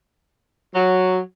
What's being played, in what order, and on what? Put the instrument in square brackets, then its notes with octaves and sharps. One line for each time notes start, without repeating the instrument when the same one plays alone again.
[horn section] F#3